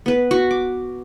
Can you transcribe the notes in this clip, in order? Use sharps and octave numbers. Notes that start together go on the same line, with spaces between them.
B3 B4
F#4
D6